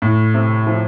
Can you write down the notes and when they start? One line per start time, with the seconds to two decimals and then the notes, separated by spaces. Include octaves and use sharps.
0.02 A2
0.34 C3
0.67 F3